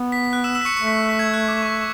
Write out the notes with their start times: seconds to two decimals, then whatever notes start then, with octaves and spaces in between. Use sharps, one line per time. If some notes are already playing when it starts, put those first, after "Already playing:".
Already playing: B3
0.12 B6
0.33 F#6
0.44 E6 E7
0.55 E6 E7
0.61 B6
0.65 C#6 C#7
0.76 A3 C#6 C#7
0.87 B6
1.09 B6
1.19 G#6
1.34 F#6
1.48 D6
1.62 C#6